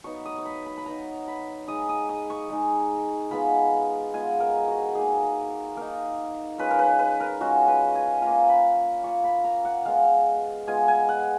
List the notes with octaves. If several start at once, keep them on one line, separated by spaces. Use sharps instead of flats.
F#3 B3 D#4 C#6
D#6
C#6
B5
B5
B5
F#3 B3 D#4 A#5
B5
G#3 D#4 D#6
D#6
D#6
C#6
G#3 D#4
G#3 B3 F4 B5
G#3 B3 F4 G#5
A#4
F#4
A#3 D#4 G#4
A#3 D#4 A#4
G#3 C#4 F4 B4
A#4
B4
B4
A#4
G#3 C#4 F4 F#4
B4
G#5
A#3 C#4 F4 A#5
B5
A#3 C#4 F4 C#6
B5
A#5
F#5
G#3 B3 F4 F5
G#3 B3 F4 G#5
G#5
F#5